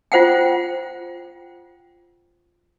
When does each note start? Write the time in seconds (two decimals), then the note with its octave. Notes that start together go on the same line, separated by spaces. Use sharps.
0.12 F4 C5 F#5 G5